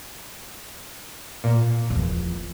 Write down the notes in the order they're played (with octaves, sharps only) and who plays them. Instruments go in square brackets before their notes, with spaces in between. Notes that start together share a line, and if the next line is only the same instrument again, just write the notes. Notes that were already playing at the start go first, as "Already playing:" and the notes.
[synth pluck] A#2
[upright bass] E2 F3